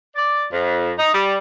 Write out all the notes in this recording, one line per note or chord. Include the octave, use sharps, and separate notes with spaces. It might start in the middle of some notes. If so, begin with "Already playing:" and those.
D5
F2
D#4
G3